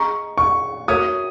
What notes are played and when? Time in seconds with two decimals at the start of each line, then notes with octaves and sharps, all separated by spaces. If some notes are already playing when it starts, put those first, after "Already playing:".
Already playing: G#4 D#5 A#5 C#6
0.38 C#6
0.88 F#4 A#4 C#5 E5 D#6